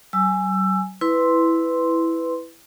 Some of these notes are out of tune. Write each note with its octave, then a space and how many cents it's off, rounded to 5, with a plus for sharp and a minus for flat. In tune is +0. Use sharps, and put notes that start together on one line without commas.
F#3 +45 G#5 +0 E6 +20
E4 +0 B4 +10 C6 +0